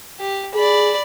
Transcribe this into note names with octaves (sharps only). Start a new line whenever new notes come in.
G4
G#4 D5 B5